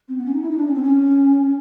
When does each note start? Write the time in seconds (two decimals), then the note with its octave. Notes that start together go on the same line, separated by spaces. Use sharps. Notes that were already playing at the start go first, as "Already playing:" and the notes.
0.08 C4
0.17 B3
0.26 C#4
0.33 D#4
0.41 E4
0.50 D#4
0.57 D4
0.67 C#4
0.74 C4
0.82 C#4